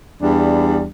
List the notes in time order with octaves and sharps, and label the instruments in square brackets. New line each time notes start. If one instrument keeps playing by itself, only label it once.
[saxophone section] E2 G3 D4